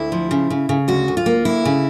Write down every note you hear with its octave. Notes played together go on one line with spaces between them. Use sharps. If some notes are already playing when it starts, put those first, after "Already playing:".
Already playing: D2 E4
F3
C#3
C#3
C#3
D2 F#4
D2
F4
A#3
D2 E4
C#3